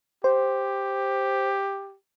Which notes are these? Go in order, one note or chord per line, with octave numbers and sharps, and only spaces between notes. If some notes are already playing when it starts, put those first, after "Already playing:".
G4 C5